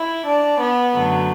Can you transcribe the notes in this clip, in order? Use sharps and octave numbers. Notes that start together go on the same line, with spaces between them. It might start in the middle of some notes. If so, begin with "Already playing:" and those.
Already playing: E4
D4
B3
F#2 D3 F#3 A3